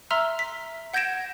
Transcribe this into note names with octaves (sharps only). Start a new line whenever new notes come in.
E5 A#5 C6 E6 F6
B6
F#5 G6 G#6 A#6 D7 E7